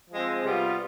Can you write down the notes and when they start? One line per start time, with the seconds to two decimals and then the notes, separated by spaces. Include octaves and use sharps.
0.10 F3 G#3 C4
0.43 C3 G3 B3 F4